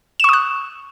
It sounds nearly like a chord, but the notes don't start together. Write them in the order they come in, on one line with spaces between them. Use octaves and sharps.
E7 C#6 D#6 F#6